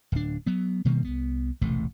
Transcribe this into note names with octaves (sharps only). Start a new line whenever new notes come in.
D1 D4
F#3 B3
B2 D#3 G3 A#3
C2 B3
E1 A1 C3 A3